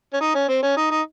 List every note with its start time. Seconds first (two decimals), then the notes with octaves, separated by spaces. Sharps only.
0.13 C#4
0.21 D#4
0.35 C#4
0.49 C4
0.63 C#4
0.77 D#4
0.91 D#4